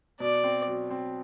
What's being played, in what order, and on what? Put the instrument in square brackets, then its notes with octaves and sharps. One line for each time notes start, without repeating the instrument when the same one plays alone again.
[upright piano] B2 [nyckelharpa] D5
[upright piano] C4
F#3
C4